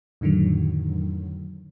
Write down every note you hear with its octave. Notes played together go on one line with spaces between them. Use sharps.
F2 A2 D3 D#3 F#3